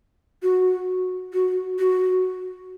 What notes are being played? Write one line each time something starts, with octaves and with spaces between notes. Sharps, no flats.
F#4
F#4
F#4